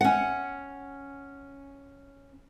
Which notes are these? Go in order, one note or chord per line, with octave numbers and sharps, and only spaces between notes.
C#4 F#5